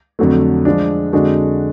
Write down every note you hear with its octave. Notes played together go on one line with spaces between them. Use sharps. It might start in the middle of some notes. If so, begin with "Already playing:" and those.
F2 D3 F#3 A3
F3 G#3 D4
F2 D3 G#3 D4 F#4